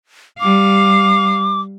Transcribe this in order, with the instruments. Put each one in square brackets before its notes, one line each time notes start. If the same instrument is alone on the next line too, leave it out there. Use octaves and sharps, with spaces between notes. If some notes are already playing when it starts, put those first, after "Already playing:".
[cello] G3 F5 [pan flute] D6